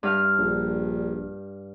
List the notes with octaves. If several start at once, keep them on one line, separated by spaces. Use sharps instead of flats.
G2 F5 F6
A#1